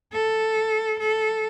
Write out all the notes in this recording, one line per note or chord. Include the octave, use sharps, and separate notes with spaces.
A4
A4